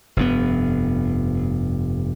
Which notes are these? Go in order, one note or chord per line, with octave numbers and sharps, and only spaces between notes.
F1 G2 B3